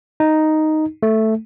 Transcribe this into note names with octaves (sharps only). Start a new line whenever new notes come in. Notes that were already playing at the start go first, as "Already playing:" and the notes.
D#4
A3